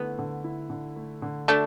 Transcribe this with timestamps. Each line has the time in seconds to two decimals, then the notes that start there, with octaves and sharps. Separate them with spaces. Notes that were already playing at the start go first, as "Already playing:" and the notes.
Already playing: D3 A3 B3 E4
0.19 D3
0.44 E4
0.70 D3
0.96 A3
1.22 D3
1.48 A3 D4 F#4